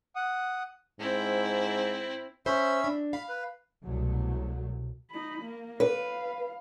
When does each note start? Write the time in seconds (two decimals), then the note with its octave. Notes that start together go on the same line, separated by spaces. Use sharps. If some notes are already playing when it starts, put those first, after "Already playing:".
0.16 F#5 D#6
0.99 G#2 C4 E4
2.46 C#4 C5 E5 B5
2.84 D4
3.13 F5 B5
3.29 B4
3.84 C2 B2 F#3 A3
5.11 D#4 B5
5.42 A#3
5.80 B4 F5